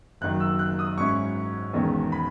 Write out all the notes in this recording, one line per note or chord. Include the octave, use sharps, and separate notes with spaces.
F#1 F#2 D#3 F#3 F#6
E6
F#6
D#6
G#2 F#3 C#4 E4 C#6
E1 E2 D#3 G#3 C#4
B5